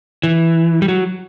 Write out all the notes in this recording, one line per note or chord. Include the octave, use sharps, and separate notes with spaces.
E3
G3
F#3